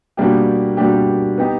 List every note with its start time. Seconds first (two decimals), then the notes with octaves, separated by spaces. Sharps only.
0.17 B2 G3 A#3 D4 G4
0.77 B2 G3 A#3 D4 G4
1.37 B3 D#4 G4